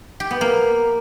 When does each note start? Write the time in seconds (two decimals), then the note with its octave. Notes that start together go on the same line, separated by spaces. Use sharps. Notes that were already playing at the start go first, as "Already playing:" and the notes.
0.20 G4
0.31 B3
0.41 A#3